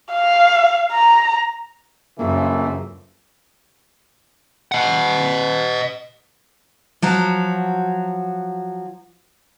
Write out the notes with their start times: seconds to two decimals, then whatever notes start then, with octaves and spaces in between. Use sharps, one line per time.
0.13 F5
0.92 A#5
2.19 A#1 F#2 C#3 E3 A3 A#3
4.72 D#5 F#5
7.02 F3 F#3 F#4